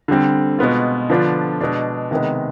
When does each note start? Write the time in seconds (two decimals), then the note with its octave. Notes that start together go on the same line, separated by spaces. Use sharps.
0.08 D3 G3 C4
0.59 B2 G#3 B3 F4
1.09 D3 F3 B3 D4 F4
1.61 B2 G#3 D4
2.11 C3 D#3 G#3 B3